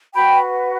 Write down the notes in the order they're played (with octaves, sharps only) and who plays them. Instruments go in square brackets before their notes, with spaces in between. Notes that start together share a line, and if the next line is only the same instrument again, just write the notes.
[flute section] F#4 B4 G5 B5